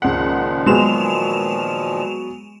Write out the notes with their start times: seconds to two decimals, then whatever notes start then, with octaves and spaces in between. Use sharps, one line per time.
0.02 C#2 A#2 D#3 F3 F#5
0.66 F#3 G#3 B3 G#4 E7 F7